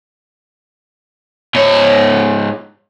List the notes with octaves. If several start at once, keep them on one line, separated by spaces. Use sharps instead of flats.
G#2 C#5